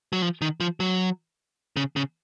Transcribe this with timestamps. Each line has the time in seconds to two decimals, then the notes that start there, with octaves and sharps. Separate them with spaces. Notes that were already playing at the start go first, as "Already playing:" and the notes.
0.13 F#3
0.22 F3
0.41 D#3
0.60 F3
0.80 F#3
1.77 C#3
1.96 C#3